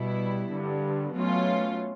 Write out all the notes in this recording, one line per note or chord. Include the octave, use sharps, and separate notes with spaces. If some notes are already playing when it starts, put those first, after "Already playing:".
Already playing: B2 G3 B3 E4
G2 D3 G3
B2 F#3 A3 C#4 F4